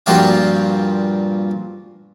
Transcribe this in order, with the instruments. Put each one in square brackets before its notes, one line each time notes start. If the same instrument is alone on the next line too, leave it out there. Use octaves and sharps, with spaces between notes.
[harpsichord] G2 A#2 F3 F#4 F5 G5